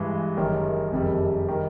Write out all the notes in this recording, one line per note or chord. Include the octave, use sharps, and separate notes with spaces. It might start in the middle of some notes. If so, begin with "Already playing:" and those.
Already playing: G2 E3 G#3
F#1 F#2 D#3 G3
F#1 F2 C3 D#3 G3
D#3 G3